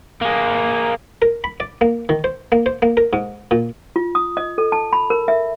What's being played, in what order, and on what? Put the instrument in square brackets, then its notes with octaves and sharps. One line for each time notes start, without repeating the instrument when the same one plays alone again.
[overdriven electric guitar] A#3 G#4
[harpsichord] A#4
B5
D5
A#3
D#3
C5
A#3
C5
A#3
A#4
G#2
A#2
[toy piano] F4
D#6
D#5
A4
A5
B5
A#4
E5